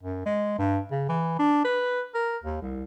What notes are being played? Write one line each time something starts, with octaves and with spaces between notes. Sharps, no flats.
F#2
G#3
G2
C#3
E3
D4
B4
A#4
D#2
C2